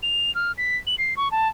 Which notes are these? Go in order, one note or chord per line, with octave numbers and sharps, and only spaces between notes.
F7
F6
B6
F#7
C7
C#6
A5